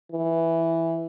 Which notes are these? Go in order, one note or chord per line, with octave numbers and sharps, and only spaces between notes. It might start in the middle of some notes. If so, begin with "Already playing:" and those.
E3